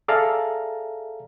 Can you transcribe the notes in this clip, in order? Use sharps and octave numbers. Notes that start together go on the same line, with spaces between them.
G#4 A4 D5 E5 F5 A#5